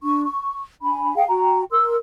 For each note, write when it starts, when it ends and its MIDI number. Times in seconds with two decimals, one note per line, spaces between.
0.03 0.24 62
0.03 0.24 85
0.25 0.61 85
0.82 1.14 62
0.82 1.14 80
0.82 1.14 83
1.16 1.24 68
1.16 1.24 77
1.16 1.24 79
1.16 1.24 80
1.28 1.63 66
1.28 1.63 79
1.28 1.63 82
1.71 1.95 70
1.71 1.95 84
1.71 1.95 88